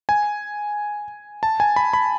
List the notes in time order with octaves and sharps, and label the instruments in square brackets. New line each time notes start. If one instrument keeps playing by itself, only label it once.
[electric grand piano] G#5
A5
G#5
B5
B5